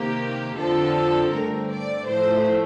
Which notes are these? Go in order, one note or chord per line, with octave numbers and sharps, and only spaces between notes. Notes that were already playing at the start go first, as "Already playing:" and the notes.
Already playing: C3 D#3 A#3 G4
F2 D3 F3 C4 A4
G2 D3 A3 C4 A#4
D5
A2 F3 A3 C5